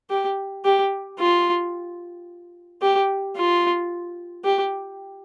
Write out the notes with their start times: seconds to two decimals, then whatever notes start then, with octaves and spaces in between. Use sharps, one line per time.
0.10 G4
0.65 G4
1.19 F4
2.82 G4
3.36 F4
4.44 G4